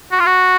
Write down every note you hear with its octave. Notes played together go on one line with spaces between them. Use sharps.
F#4
F4
F#4